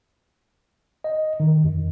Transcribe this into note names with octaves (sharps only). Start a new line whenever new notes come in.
D#5
D#3
F2